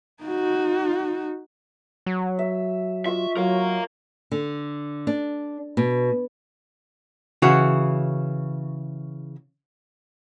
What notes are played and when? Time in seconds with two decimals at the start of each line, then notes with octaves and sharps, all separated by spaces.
0.24 D#4 F#4
2.06 F#3
2.39 E5
3.06 F4 D#5 E5 C#6
3.37 F#3 A#4 C#5 F5
4.32 D3
5.07 D4
5.77 B2
7.42 C#3 E3 F#4